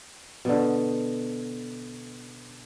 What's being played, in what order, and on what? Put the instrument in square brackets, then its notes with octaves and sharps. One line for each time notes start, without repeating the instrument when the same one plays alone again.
[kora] B2 D3